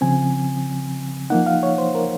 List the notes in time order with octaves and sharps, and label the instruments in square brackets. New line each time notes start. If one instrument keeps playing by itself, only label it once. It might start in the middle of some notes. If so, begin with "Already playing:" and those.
[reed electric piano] C#3 F3 C4 G#5
F3 A#3 D#4 F#5
F5
C#5
C5
A#4